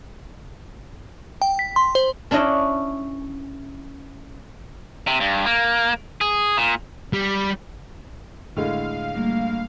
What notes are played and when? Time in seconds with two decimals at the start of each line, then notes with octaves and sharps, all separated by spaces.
1.42 G5
1.59 B6
1.76 C6
1.95 C5
2.31 C#4 D4 E4 C#5 D#5
5.07 C3
5.20 G2
5.46 A#3
6.21 G#4
6.57 A#2
7.13 G3
8.56 A2 D3 G#3 F5
9.14 G3 A3 A#3